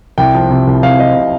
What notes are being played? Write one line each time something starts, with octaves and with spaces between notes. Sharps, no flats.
C2 G5
F3
C3
C2
C2 F5
F3 D#5
C3